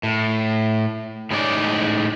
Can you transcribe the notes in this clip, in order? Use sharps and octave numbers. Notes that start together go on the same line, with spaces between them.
A2
A2 G#3 C#4 D#4 G4 D5